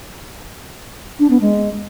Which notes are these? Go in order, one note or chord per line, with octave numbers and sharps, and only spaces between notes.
D4
B3
G#3